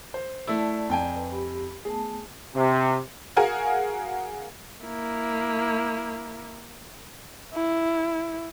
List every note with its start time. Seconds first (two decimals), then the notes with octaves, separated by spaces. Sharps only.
0.14 C5
0.47 A3 E4 D5 A5
0.89 F2 G5 G#5
1.16 B4
1.32 G4 B5
1.85 A3 B3 G#4 A5
2.55 C3
3.36 F#4 G#4 A#4 F5 G#5
4.85 A#3 E4
7.54 E4